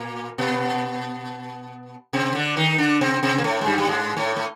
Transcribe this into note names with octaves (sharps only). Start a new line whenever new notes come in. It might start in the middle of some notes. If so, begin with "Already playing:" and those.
Already playing: A#2 A#3
B2 B3
C3 C4
D3 D4
D#3 D#4
D3 D4
C3 C4
C3 C4
A#3
A2 A3
G#3
G2 G3
G3
G#2 G#3
A2 A3
A3